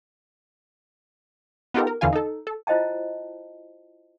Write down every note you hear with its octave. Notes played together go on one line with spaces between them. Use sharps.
B3 D#4 F4 G4 A4 A#4
A#4
E2 D3 E3 F4 F5 G#5
D#4 A4
A4
E4 F4 C5 D#5 G5 A5